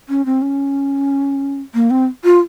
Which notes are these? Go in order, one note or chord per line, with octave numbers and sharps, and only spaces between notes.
C#4
C4
C#4
A#3
C4
F4